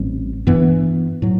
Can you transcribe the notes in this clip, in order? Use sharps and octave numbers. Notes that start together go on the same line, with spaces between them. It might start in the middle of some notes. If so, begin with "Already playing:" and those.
Already playing: A1 A2 G3 C4
G2 E3 B3
A2 F#3